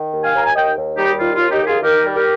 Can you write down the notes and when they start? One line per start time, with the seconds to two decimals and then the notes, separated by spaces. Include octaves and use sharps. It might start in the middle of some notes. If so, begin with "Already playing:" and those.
Already playing: D#3
0.13 D#2
0.24 F5 G#5
0.35 D#2 A#5
0.45 G#5
0.55 D#2 D#5 G5
0.77 D#2
0.97 G3 D#4 G4
1.19 D#2 F4
1.35 F4
1.41 D#2
1.50 D#4 G4
1.61 D#2
1.67 F4 G#4
1.82 D#3 G4 A#4
2.05 G3
2.14 G4 A#4